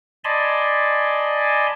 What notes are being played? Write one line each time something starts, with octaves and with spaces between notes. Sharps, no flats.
D5 D#5 G#5 A5 B5 C6